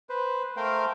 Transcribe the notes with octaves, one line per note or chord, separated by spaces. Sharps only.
B4 C5
A3 A#4 C5 F5 G5